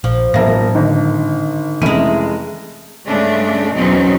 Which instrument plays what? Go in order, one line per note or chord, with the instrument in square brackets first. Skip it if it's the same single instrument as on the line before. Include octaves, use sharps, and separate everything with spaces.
[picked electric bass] A#1 [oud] F3
[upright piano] E1 E5 A#6 [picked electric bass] A2 E3 F#3 [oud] A#3 F4
[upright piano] G#1 [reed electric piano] D3 D#4
[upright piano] F1 D#7 [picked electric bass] E3 C4 C#4 [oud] G#3 E4
[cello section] G2 C#3 G#3 A3 D4
E2 B2 F#3 C4 C#4 D#4